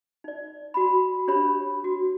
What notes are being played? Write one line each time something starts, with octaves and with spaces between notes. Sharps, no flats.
D#4 D5
F#4 B5
D4 G4 C#5 B5
F#4